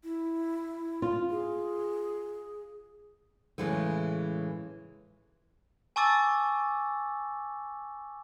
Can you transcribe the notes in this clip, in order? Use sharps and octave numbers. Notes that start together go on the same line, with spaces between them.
E4
F4
G#4
A2 C#3 E3 G#3 A3
G#5 A5 C#6 D6 E6 A6